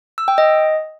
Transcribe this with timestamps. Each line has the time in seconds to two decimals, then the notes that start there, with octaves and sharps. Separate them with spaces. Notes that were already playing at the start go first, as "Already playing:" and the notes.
0.18 E6
0.28 G5
0.38 D#5